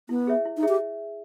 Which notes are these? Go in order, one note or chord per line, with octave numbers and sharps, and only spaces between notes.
B3 E4
G#4 C#5 E5
E4
D#4
G#4 C#5 E5
G4